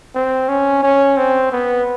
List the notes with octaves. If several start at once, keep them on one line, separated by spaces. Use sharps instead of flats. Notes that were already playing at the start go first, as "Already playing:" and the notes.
C4
C#4
C#4
C4
B3